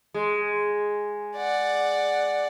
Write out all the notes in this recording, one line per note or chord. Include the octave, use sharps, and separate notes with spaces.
G#3
D5 F#5